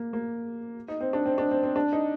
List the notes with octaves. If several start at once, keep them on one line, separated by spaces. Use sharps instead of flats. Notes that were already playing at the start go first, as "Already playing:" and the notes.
Already playing: A#3
A#3
D#4
C4
D4
C4
D4
C4
C4
D4
D#4